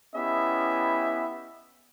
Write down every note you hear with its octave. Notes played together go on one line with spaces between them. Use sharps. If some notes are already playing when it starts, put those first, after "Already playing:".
B3 C#4 E4 G4 D#5 E5